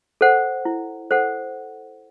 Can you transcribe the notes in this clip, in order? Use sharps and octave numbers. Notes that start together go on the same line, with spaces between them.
A4 C5 F#5
E4
A4 C5 F#5